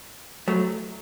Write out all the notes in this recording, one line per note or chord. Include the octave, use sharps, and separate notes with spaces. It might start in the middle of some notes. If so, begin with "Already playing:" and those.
F#3 A3